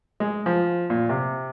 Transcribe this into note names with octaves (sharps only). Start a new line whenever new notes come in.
G#3
F3
A#2
C3